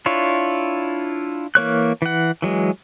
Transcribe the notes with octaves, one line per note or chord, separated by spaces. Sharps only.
D4 E4 F4 C#5
E3 A#3 C#5 F#6
E3 F#5
E3 F#3 G#3